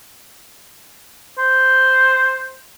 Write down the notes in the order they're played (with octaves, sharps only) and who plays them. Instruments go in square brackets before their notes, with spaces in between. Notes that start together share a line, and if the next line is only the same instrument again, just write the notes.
[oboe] C5